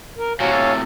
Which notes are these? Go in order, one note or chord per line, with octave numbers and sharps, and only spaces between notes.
A#4
A2 C3 F#4 C#5 F5 G#5
A4